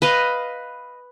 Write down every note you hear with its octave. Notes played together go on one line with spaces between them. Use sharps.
B4 D#5 F5